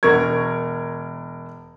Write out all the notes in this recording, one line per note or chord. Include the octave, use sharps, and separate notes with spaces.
E1 A#4 C#6 G#6